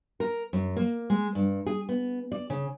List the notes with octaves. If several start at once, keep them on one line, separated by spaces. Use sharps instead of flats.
A#4
F#2
A#3
G#3
G2
G#4
B3
D5
C#3